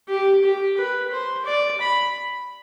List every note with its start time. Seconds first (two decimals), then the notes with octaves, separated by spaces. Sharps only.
0.09 G4
0.44 G4
0.77 B4
1.12 C5
1.46 D5
1.81 B5